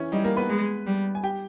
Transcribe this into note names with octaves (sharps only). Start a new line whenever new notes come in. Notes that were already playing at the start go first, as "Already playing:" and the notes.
Already playing: E3 C#4 E4
G3 D#4
A#3 A#4
B3 B4
G#3
G3
G#5
G4 G5